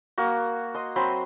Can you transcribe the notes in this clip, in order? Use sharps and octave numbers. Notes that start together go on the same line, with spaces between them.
A#3 F#4
D#5 C6
F#3 C4 B5 C6